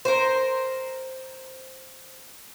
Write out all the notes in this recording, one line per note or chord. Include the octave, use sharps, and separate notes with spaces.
A#4 C5